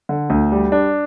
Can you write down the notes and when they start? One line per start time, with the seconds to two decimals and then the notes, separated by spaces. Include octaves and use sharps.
0.09 D3
0.30 D2
0.52 G3
0.72 D4